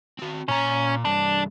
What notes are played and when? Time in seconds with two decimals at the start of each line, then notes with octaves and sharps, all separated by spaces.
0.19 C4 F#4
0.48 A#2 C#4 A#5
1.05 C2 G2 D4